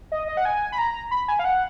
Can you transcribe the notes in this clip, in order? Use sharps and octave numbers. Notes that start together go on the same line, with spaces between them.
D#5
D#5
F#5
G#5
B5
A#5
B5
G#5
F5
F#5